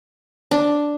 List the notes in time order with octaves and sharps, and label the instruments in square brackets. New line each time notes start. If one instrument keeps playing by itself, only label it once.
[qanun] D4